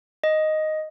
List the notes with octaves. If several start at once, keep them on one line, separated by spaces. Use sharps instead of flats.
D#5